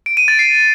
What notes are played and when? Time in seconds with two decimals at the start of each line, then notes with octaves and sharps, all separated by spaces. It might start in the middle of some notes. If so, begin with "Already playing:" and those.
0.06 D7
0.17 D#7
0.28 A6
0.39 C7